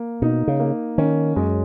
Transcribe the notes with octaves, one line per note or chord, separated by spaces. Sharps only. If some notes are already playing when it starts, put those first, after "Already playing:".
Already playing: A#3
B2 D#4
C#3
A#3
D#3 C#4
F#2 G#3